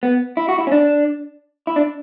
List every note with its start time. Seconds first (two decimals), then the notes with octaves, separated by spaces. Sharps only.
0.03 B3
0.37 E4
0.49 F#4
0.59 E4
0.67 C#4
0.72 D4
1.67 E4
1.76 D4